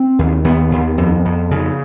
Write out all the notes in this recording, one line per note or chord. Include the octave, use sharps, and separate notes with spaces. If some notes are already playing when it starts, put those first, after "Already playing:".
Already playing: C4
D#2
D#2 B3
D#2
F2
F2
C#3